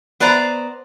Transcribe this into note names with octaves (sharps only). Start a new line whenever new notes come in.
B3 B4 C5 D5 A#5